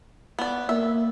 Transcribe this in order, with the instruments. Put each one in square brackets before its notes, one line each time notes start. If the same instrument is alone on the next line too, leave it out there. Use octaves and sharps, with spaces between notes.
[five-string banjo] B3 D5
[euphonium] A#3 [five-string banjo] E5